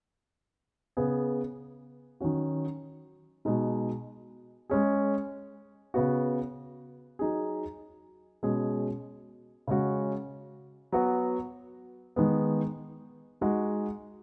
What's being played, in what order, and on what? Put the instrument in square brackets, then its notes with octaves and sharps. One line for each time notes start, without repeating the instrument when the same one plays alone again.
[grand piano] C#3 B3 G#4
D#3 F#3 C#4 F#4
B2 G#3 D#4
G#3 C#4 G#4
C#3 B3 F#4
F#3 D#4 G#4
B2 G#3 C#4 G#4
C#3 G#3 C#4 F#4
F#3 B3 F#4
D#3 G#3 B3
G#3 D#4 F#4